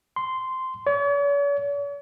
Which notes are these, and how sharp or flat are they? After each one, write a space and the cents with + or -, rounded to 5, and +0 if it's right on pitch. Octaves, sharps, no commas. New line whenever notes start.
C6 -10
C#5 +45